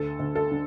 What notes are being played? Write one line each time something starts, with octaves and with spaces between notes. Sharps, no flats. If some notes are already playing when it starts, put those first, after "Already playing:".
Already playing: D2 A4
D2
A4
D3